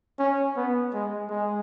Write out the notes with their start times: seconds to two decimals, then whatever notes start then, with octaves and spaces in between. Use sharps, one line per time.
0.19 C#4
0.56 B3
0.93 G#3
1.30 G#3